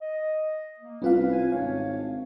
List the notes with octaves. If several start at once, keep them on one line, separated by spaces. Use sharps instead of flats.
D#5
A#3
C2 C#4 F4 B4 F5
G#5
G#1 G#2 D4 C#5 F5